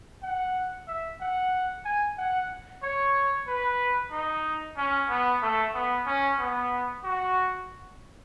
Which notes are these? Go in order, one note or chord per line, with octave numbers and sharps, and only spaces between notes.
F#5
E5
F#5
G#5
F#5
C#5
B4
D#4
C#4
B3
A3
B3
C#4
B3
F#4